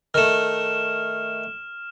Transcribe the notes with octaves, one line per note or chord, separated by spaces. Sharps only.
D#3 A3 F6 E7